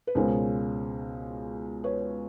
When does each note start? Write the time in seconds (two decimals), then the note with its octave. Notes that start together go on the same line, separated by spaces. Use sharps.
0.07 B4
0.15 C#2 B2 G#3 C#4 A#4 C5
1.84 B4 C#5